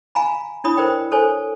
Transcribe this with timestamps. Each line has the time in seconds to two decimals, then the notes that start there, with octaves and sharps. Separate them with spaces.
0.15 F5 G#5 A#5 B5
0.64 D4 E4 C#5 B5 D#6
0.77 A#4 C5 D5 G5
1.11 A4 C5 C#5 G#5